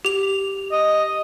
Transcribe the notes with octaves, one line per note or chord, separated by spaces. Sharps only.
G4 F7
D#5